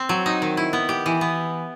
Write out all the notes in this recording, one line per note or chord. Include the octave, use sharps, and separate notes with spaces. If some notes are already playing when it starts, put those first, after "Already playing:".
Already playing: C4
F#3
D#4
D#3
E4
B3
G4
E3
B3